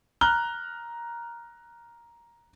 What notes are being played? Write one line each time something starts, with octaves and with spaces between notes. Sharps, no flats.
A#5 F6 F#6 G7